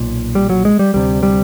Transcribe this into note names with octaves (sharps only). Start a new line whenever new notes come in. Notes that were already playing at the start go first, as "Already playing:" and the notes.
Already playing: B1 A#2
G3
F#3
G#3
G3
D2 C3 G3
G3